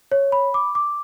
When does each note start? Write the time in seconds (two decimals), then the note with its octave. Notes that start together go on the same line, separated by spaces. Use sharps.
0.12 C#5
0.32 B5
0.54 D6
0.75 D6